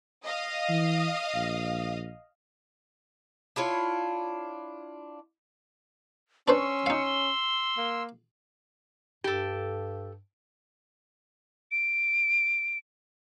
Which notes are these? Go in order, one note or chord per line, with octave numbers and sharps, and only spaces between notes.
D#5 F5 D#6
E3
A#1
D4 E4 F4 C#5
C#4 D4 B4 C5 C6 C#6 E6
D#4 F5 C#7
G7
A#3
G2 G4 A4
D7